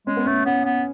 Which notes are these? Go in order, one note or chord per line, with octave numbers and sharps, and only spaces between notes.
G#3 C#4
B3
A3 C#4
B3 C#4
B3